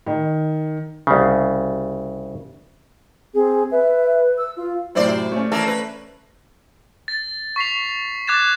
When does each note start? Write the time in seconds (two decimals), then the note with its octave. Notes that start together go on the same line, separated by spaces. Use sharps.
0.06 D#3
1.07 C2 C#3
3.34 C4 G#4
3.71 B4 E5
4.38 E6
4.57 F4
4.95 F#2 A2 C3 E4 C5 D5
5.32 A3 C#4
5.52 E3 A#3 A4
5.67 B4
7.08 A6
7.56 C#6 B6 C7 F7
8.27 D6 F#6 G#6 A6 E7